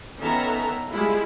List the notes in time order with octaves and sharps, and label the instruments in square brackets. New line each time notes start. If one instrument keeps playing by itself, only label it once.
[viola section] D#3 B3 C#4 A4 E5 A#5
G3 G#3 E4 F4